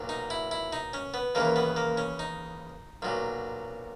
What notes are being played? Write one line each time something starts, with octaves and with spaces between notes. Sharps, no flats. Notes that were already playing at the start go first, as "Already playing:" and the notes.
Already playing: B1 A#2 F#3
D#4
E4
E4
D#4
C#4
B3
D#2 C#3 E3 A#3
B3
A#3
C#4
D#4
B1 A#2 F#3